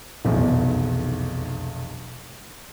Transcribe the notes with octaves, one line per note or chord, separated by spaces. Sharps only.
F1 B1 E2